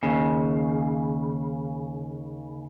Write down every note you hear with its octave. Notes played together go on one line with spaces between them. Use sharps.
D#2 C#3